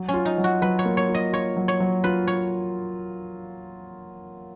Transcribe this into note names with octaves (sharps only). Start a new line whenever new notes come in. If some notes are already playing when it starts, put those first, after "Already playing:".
Already playing: F#3
C#4
F4
D#4
F#3
F#4
F#3 B4
C#5
A#3
C#5
F4
D#5
F4 C#5
F#3
C#5
F#3
F4 B4
C#5